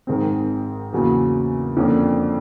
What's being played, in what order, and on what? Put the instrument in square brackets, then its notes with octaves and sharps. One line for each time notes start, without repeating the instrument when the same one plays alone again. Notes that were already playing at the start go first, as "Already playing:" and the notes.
[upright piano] G#1 G#2 D#3 G#3 C4
E2 C#3 F#3 A#3
F2 D3 F3 A#3 C#4